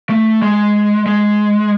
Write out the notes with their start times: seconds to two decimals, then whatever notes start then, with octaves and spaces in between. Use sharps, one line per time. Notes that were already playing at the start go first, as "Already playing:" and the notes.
0.10 A3
0.42 G#3
1.06 G#3